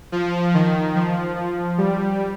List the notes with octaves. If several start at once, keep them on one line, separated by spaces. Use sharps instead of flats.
F3
D#3
F3
F3
G3